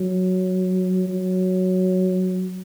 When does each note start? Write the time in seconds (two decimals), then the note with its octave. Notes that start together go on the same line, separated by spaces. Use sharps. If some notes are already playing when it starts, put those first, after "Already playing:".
Already playing: F#3
1.08 F#3